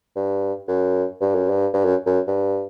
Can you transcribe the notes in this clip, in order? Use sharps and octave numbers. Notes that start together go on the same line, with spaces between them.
G2
F#2
G2
F#2
G2
G2
F#2
F#2
G2